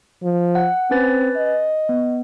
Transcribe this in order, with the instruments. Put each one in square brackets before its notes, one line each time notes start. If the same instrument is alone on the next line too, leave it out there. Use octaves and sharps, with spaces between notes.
[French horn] F3
[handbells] F#5
[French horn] C4 [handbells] C#4 B4 A6
[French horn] D#5
[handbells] B3